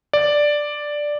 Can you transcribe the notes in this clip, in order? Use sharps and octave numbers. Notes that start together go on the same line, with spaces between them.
D5